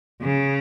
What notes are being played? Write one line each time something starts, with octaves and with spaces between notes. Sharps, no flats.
C#3